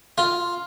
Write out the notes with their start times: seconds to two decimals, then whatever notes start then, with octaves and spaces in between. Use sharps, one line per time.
0.18 F4